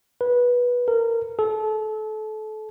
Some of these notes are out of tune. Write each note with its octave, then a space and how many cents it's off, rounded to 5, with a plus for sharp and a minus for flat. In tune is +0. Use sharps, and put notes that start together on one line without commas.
B4 -15
A#4 -25
A4 -30